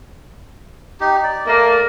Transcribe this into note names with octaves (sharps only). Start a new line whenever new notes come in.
D#4 G4
D5
A3 A#3